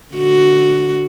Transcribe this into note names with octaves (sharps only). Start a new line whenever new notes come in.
D3 F#4